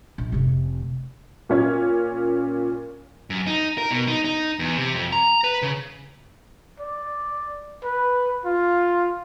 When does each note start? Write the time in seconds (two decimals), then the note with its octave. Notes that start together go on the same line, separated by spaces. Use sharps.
0.18 A#1
0.32 F1 C3
1.49 A#2 C#4 G#6
3.30 F#2
3.47 D#4
3.78 A#4
3.91 B2
4.08 D#4
4.25 D#4
4.59 E2
4.77 C3
4.94 F2
5.12 A#5
5.44 B4
5.62 C#3
6.80 D5
7.84 B4
8.45 F4